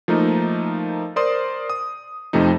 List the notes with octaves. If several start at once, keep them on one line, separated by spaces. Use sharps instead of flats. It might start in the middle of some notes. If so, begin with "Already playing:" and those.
F3 A3 A#3 D#4
A#4 C5 D5 C6 D#6
D#6
F2 C3 F3 A3 D#4